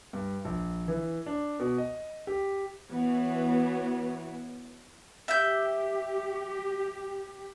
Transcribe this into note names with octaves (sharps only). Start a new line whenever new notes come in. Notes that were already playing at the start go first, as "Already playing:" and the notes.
G2
A#1
E3
D4
B2
D#5
G4
E3 B3 F#4 C#5
G4 E5 G6